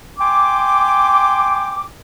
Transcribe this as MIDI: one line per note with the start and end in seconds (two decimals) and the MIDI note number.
0.18 1.85 79
0.18 1.85 80
0.18 1.85 84
0.18 1.85 86